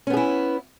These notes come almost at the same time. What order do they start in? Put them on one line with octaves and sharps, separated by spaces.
C#4 B3 G#4 E4